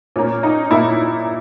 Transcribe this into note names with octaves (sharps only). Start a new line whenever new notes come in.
A#2 A#3 C#4
D#4
A#2 A#3 E4